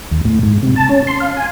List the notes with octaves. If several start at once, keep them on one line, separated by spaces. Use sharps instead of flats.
D#2
A2
G#2
C3
A5
C#4
C6
F5
G#5